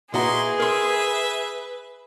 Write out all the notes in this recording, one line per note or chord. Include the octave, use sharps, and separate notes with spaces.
A#2 E4 F#4 G#4 B4 D#5 A#5 C6
A#4 E5 C6